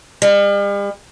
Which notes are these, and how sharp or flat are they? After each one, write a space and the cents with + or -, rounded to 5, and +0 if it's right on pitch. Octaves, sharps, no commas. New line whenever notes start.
G3 +45